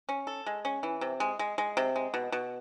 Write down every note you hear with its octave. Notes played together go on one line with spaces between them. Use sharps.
C#4
A4
G#3
C#4
E3
C3
G#3
G#3
G#3
C3
G#3
B2
B2